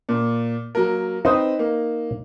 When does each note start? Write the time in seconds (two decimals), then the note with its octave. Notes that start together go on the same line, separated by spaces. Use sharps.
0.09 A#2
0.75 F#3 A#3 A#4
1.25 C4 D#4 B4 C5
1.59 A#3